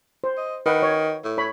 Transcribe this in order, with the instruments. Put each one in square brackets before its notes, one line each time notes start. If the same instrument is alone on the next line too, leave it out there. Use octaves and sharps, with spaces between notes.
[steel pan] C5
[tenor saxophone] D#5
[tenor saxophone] D#3 [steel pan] B4 F#5
[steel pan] C#5
[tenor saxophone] A2
[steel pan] C#5 B5